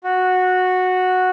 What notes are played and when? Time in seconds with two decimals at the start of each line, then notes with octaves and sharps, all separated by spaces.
0.04 F#4